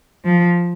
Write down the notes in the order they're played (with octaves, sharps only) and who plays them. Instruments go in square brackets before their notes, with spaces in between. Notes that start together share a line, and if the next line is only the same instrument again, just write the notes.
[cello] F3